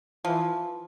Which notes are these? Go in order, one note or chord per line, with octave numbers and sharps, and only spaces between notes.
E3 F3